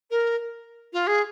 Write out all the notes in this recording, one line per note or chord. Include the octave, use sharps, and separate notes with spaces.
A#4
F4
G#4